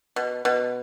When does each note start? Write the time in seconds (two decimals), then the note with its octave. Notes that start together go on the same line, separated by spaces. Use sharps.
0.16 B2
0.45 B2